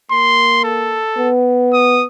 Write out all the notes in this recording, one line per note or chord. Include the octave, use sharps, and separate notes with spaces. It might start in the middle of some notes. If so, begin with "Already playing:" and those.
A#3 C6
A4
B3
D#6